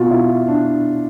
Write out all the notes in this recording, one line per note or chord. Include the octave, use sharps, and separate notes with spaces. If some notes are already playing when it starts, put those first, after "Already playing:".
Already playing: B2 F4 F#4
E4
D4